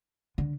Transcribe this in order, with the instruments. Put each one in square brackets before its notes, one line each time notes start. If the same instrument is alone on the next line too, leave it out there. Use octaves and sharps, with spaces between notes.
[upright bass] D3